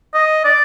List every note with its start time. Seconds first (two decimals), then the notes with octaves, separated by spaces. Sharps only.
0.14 D#5
0.44 D5